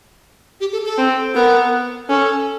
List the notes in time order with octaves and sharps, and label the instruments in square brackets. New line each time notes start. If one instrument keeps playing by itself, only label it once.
[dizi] G4
A4
A4
[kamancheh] C4
[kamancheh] B3 [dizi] A#4
[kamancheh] C#4 [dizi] A4